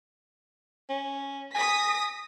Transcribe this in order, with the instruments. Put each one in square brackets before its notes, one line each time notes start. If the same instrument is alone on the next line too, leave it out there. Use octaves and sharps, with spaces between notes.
[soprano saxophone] C#4
[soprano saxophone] G#5 [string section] D#6 A#6 B6